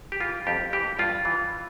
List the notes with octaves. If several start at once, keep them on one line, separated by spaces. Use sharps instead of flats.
G4
E3 F4
F2 G4
E3 G4
G2 F4
E3